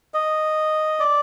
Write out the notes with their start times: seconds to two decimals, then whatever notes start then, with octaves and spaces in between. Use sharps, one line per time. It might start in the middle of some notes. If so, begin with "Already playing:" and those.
0.14 D#5
1.00 D5